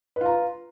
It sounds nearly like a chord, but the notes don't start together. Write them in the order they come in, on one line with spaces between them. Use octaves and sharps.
B4 F4 A#5